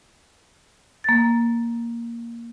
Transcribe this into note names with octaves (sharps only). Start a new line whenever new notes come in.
A#3 A6